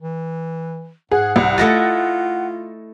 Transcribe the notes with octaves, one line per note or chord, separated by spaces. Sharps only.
E3
G#2 G#4 F#5
C2
A3 E4 F4 D#5 A6 A#6 C#7